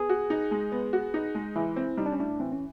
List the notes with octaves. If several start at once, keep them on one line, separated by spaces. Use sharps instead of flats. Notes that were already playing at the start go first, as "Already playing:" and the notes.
Already playing: B3 G#4
F#4
D#4
G#3
B3
F#4
D#4
G#3
E3 E4
C4
G3 D#4
D4
C#4
A2 D4
E3 C4
C#4